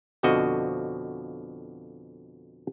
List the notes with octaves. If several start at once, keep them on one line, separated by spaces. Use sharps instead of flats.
F2 B2 D3 F3 F#4 D#5